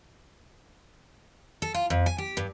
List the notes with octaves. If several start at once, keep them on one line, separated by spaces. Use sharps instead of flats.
A4
F4
F2
G#5
G4
G2